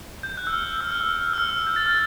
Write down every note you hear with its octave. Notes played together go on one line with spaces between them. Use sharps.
G6
F#6
E6
F6
E6
F6
E6
E6
F6
G6
A6
F6